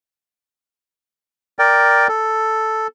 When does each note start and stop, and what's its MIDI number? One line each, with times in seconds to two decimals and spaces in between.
1.59 2.08 70
1.59 2.08 74
1.59 2.08 79
2.09 2.87 69